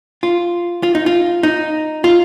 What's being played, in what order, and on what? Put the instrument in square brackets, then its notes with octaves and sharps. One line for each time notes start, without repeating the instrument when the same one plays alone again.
[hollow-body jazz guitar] F4
F4
D#4
F4
D#4
F4